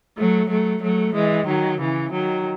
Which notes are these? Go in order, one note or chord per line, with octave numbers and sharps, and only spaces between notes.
F#3 A3
F#3 A3
F#3 A3
E3 G#3
D#3 F#3
C#3 E3
D#3 F#3